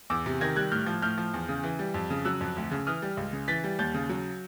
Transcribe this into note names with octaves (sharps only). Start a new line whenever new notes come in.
E2 D6 E6
C3
D#3 G#6 A#6
G3 F#6 G#6
A2 F6 G6
F3
A2 F6 G6
F3
E2
C#3
E3
G3
F2
C#3
F#3 E6 F#6
F2
D2
C#3
E3 D#6 F6
G3
C#2
C#3
E3 A6 B6
G3
D#2 G6 A6
C#3
F#3